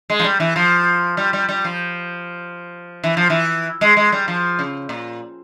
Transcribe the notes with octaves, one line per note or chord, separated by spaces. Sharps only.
G#3
F3
G3
E3
F3
G3
G3
G3
F3
E3
F3
E3
G#3
G#3
G3
F3
C#3
A#2